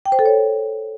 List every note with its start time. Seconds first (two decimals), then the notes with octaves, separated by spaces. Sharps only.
0.06 G5
0.12 C5
0.19 A4
0.26 C#5